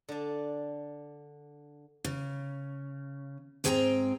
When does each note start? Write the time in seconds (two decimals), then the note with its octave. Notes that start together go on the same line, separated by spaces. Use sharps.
0.09 D3 D4
2.05 C#3
3.64 G#2 C4 G#4 G5 G#5 A#5